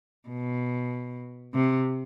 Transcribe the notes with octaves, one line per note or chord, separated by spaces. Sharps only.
B2
C3